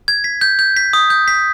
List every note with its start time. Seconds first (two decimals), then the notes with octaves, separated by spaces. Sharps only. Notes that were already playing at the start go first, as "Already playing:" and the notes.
0.08 G#6
0.24 B6
0.41 G6
0.59 G6
0.77 B6
0.93 D#6
1.10 G6
1.28 B6